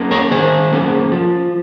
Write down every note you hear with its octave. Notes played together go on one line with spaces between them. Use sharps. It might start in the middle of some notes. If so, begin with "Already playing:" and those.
Already playing: A#3 C#4
A#4 C#5
D#3 G#4 C5
A#3 C#4
F3